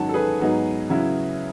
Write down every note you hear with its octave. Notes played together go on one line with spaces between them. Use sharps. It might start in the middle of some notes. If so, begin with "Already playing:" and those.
Already playing: G#2 D#3 F#3 C#4 F#5 A5
A4
G#4 B4
G#2 F#3 B3 D#4
C#3 F#3 C#4 E4